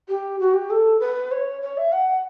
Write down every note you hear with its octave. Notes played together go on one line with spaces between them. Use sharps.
G4
F#4
G4
A4
B4
C#5
C#5
E5
F#5